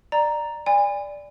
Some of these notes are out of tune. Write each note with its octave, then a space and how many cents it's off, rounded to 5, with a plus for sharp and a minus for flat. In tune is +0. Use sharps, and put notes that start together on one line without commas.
D5 +15 A#5 +0
D5 +0 G#5 -35 B5 +30